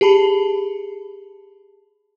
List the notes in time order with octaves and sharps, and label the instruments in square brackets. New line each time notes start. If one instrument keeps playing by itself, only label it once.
[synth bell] G4 G#4 A5 B5